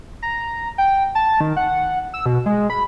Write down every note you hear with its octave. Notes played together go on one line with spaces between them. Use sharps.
A#5
G5
A5
D#3
F#5
E6
B2
G#3
B5